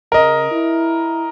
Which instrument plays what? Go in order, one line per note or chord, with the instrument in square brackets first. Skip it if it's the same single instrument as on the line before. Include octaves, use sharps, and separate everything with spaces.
[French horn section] C#3 [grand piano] A#4 D#5
[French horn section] E4